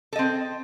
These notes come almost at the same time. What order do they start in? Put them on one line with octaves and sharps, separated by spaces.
A4 D#5 C4